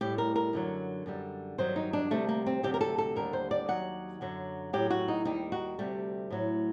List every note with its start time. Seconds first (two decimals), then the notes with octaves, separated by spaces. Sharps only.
0.01 A2 G3 G4
0.18 A#4
0.36 A#4
0.53 F#2 D3 F#3
1.06 F#2 D3 G3
1.58 G2 D#3 F#3 C5
1.76 D#4
1.93 D4
2.11 D2 C3 D#3 G3 A3
2.29 A#3
2.46 C4
2.63 D2 C3 F#3 G4
2.74 A#4
2.81 A4
2.98 A4
3.16 D#2 D3 G3 A#4
3.33 C5
3.51 D5
3.68 D#2 D#3 F#3 F#5
4.21 F#2 D3 F#3
4.73 A2 F#3 G4
4.90 F#4
5.08 D#4
5.25 D#2 D#3 G3 D#4
5.52 F#4
5.79 D2 C3 G3 A3
6.30 A2 F#3